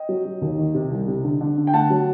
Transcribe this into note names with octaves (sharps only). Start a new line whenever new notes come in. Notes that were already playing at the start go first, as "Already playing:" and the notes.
Already playing: D#5 G5
F#3
F#3
D#2
D#3
C3
C2
C3
D3
D3
D3
G5
A3 F#5 A5
F#3